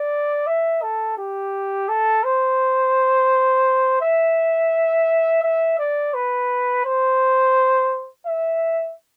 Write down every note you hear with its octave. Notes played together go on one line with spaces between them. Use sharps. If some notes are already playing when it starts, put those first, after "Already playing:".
Already playing: D5
E5
A4
G4
A4
C5
E5
E5
D5
B4
C5
E5